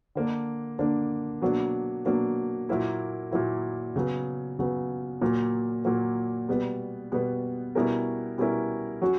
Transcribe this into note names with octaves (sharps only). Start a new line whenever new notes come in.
D3 A#3 D4
D3 A#3 D4
B2 F#3 A#3 D4
B2 F#3 A#3 D4
A#2 F#3 A#3 E4
A#2 F#3 A#3 E4
C#3 F#3 B3
C#3 F#3 B3
A#2 F#3 A#3
A#2 F#3 A#3
B2 G3 B3
B2 G3 B3
B2 G3 C#4 E4 A#4
B2 G3 C#4 E4 A#4
F#3 C#4 F#4